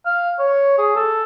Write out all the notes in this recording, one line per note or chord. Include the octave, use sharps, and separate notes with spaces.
F5
C#5
G#4
A4